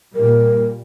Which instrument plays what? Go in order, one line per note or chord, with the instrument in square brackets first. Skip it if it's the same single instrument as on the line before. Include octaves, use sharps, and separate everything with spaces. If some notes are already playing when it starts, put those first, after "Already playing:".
[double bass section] A#2 G3 [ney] A#4